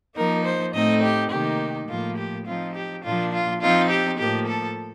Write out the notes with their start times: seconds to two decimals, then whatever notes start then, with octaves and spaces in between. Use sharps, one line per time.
0.16 F3 A#3 D#4 A#4
0.45 C5
0.74 A2 A3 C4 D#4 D#5
1.03 G4
1.31 C3 D#3 A#3 D#4 G4
1.89 A2 F3 A#3 F4
2.17 G4
2.46 F3 C4 D#4 F4
2.75 G4
3.03 A#2 F3 A#3 D4 F4
3.33 F4
3.61 F3 C4 D#4 F4
3.90 G4
4.18 A2 F3 A#3 G4
4.47 A4